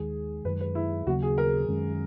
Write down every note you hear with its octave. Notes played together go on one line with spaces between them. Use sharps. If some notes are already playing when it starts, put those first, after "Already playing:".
Already playing: D#2 D#3 G#3 G#4
F#2 D#3 G#3 B4
B4
E4
D#2 C#3 F#3 A#3 F#4
G#4
A#4
F#2 D#3 G#3 C#4